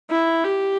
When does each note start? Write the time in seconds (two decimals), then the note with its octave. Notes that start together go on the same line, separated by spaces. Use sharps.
0.10 E4
0.44 G4